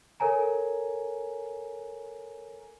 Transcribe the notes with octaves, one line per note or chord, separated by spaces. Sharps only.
A4 A#4 C#5 G#5 A#5